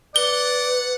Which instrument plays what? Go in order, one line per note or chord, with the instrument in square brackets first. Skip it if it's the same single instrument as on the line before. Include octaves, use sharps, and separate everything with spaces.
[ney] B4 [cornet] D5 [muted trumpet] F#5 [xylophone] G7